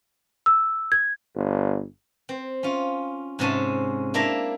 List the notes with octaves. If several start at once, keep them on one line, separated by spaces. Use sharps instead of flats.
E6
G#6
G1
C4
C#4 F4
G#2 C3 C#4 A5
A#3 D4 E4 E5 A#5